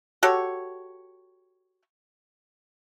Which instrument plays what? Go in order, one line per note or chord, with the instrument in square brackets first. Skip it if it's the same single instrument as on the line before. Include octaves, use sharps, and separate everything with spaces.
[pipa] F#4 G4 A4 C#5